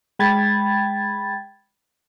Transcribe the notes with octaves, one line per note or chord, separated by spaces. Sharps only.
G#3 G5 B5 G#6 A6